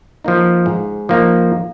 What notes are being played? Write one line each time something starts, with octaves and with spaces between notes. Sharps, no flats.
F3 A#3 D#4
G#2
F3 A#3 D#4